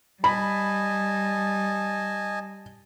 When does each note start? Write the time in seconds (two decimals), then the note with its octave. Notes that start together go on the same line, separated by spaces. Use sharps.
0.24 G3 D#5 G#5 A5 B5